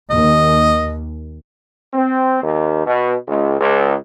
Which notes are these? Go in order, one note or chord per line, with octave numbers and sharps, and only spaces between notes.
D#2 D#5
C4
D#2
B2
C#2
C#2